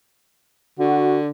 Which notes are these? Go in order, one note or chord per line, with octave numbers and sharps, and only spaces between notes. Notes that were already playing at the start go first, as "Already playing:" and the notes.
D3 F#4